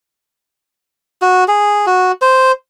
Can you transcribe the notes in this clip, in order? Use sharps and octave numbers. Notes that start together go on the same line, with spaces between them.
F#4
G#4
F#4
C5